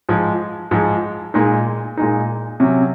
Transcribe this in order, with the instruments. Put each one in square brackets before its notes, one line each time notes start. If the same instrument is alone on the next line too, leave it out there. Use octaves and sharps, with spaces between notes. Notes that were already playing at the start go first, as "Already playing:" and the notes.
[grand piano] G#2 F3 G#3
G#2 F3 G#3
A#2 G#3 D#4
A#2 G#3 D#4
C3 F#3 C#4